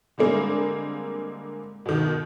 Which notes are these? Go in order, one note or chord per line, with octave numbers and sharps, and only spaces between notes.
D3 G3 G#3 A#3 C4
B2 D#3